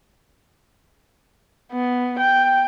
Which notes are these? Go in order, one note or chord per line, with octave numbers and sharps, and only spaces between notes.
B3
G5